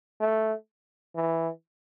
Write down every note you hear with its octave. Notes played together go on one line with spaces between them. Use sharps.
A3
E3